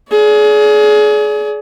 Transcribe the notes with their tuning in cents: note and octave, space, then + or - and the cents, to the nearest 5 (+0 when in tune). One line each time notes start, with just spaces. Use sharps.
G#4 +30 D5 -30